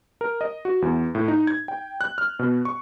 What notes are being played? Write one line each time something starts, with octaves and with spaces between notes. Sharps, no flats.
A#4
D#5
F#4
E2
A2
D#4
G#6
G5
F#6
F6
B2
C#6